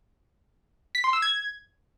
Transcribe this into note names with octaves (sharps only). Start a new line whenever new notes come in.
B6
C6
E6
G#6